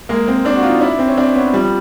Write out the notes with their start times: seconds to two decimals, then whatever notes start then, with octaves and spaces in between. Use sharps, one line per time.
0.09 G#3 A#3
0.28 A#3 C4
0.45 C4 D4
0.56 F#4
0.63 D#4 F4
0.81 D4 E4
0.99 C4
1.08 C#4
1.17 C4 D4
1.35 B3 C#4
1.53 F3 G3